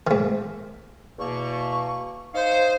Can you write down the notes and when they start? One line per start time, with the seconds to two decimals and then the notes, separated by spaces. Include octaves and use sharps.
0.07 G#2 D#3
1.19 E2 B2 A#3 C#6
2.35 D#4 C5 C#5 F5